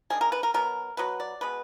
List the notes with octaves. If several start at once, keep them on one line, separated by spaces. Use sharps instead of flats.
D#3 G#3 D4 G#4
A#4
B4
A#4
B2 F#3 B3 A#4
B2 F#3 B3 B4
D5
B2 G#3 B3 B4